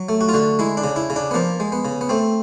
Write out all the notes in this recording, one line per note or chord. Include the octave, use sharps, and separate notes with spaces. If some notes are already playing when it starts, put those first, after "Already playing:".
Already playing: F#3
A3
F#4
F4
D3 F#4
G#3 E4
D4
C#3
E4
C#3
D4
B3
F3 A#3
G#3
B3
C#3
B3
A3 C4